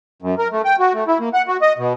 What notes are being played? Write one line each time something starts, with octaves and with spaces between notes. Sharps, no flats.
F#2
A#4
A3
G5
F#4
A3
E4
A#3
F#5
F#4
D#5
B2